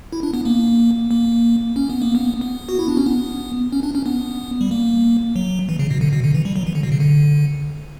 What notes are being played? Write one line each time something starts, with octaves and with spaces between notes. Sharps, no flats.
E4
D4
B3
A#3
A#3
C#4
B3
A#3
B3
B3
F#4
E4
D4
C#4
B3
C#4
D4
C#4
B3
G3
A#3
F#3
E3
C#3
B2
D3
B2
D3
E3
G3
F#3
E3
D3
B2
C#3
D3